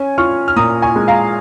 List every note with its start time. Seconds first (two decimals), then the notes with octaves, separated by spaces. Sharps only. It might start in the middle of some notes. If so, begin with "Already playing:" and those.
Already playing: C#4 G#5
0.18 F4 C#6 F6
0.48 F6
0.56 A#2 A#5 D#6
0.82 G#5 C#6
0.96 G#3
1.08 F5 A#5